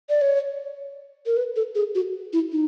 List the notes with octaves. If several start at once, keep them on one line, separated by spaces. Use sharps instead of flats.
D5
C#5
A#4
B4
A4
G#4
F#4
E4
D#4